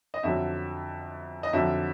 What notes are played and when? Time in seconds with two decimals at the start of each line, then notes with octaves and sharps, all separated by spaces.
0.14 D#5
0.23 F2 D3 F#3 E5
1.43 D#5
1.53 F2 D3 F#3 E5